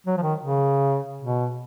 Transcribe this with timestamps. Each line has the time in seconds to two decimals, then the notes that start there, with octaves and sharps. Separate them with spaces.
0.06 F#3
0.17 F3
0.22 D#3
0.40 C#3
1.23 B2